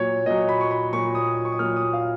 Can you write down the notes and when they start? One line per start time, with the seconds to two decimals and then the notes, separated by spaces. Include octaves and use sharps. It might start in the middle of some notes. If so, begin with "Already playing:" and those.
Already playing: A#2 F#3 C#5
0.26 A#2 F#3 D#5
0.49 B5
0.61 C#6
0.71 B5
0.93 A#2 F#3 C#6
1.15 D#6
1.45 C#6
1.52 D#6
1.59 A#2 F#3 F6
1.76 D#6
1.93 F5